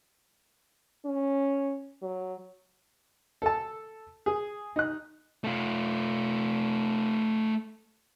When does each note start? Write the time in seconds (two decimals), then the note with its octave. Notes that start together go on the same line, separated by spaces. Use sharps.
1.06 C#4
2.02 F#3
3.42 A4 A5
4.26 G#4
4.76 D#4 F#6
5.44 A3 F4